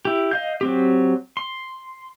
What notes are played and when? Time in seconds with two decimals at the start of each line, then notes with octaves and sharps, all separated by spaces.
0.05 E4 G4
0.31 D#5 F5 G6
0.61 F#3 C4 G4
1.37 C6